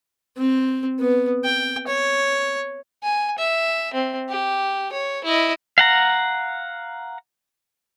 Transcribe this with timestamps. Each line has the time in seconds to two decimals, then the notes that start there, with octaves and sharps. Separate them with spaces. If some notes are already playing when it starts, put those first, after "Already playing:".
0.37 C4
1.00 B3
1.44 G5
1.87 C#5
3.03 G#5
3.38 E5
3.94 C4
4.29 G4
4.92 C#5
5.24 E4 D#5
5.78 F5 F#5 A#5